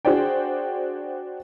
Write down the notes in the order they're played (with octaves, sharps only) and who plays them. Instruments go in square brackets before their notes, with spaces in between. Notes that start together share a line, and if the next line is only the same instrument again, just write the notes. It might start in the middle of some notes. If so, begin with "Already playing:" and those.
[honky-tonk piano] D4 F#4 G#4 C5 D5 G5